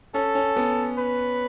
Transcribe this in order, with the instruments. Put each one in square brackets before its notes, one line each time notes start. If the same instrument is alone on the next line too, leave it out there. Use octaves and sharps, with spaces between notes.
[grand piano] C#4 [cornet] A4
[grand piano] C#4
B3
[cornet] B4